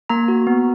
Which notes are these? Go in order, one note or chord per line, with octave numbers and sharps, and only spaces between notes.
A#3 A#5
F#4
B3